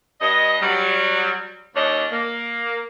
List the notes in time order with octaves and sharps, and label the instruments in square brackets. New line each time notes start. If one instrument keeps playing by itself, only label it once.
[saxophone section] G2 D#5
F#3 G3
D#2 C#4 D4 C#5 D#5
A#3